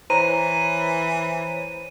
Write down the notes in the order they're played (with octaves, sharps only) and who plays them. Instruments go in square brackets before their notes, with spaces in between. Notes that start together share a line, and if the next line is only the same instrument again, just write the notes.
[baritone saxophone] E3 [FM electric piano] C5 C#5 [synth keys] A#5 [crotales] D#7